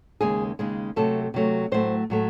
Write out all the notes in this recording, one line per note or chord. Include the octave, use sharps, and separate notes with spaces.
D#2 C#3 G#3 G#4
D#2 C#3 G#3
C3 F#3 A3 A4
C3 F#3 A3
A2 F#3 A3 C5
A2 F#3 A3